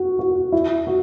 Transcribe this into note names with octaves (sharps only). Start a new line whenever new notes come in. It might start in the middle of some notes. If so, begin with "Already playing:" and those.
Already playing: F#4
F#4
E4
F#4